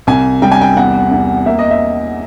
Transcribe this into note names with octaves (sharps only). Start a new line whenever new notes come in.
C2 G#5
G3 G5
G#5
G5
E2 F#5
E2
A#3 E5
D#5
E5